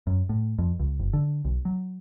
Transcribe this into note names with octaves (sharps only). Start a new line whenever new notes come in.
F#2
A2
F2
C#2
F#1
D3
B1
F#3